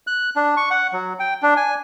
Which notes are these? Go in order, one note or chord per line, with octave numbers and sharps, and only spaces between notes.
F#6
D4
C#6
F#5
F#3
G5
D4
G#5